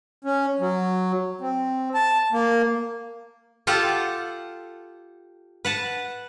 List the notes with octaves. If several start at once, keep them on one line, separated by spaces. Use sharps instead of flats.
C#4
F#3
C4
A5
A#3
F4 G4 A4 F#5
B4 F#5 A5